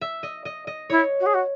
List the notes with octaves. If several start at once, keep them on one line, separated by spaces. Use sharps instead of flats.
E5
D#5
D#5
D#5
E4 C#5
F#4
G#4
F#4